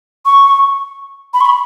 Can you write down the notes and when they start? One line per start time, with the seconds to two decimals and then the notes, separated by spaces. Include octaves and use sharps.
0.26 C#6
1.34 B5
1.41 C#6
1.46 B5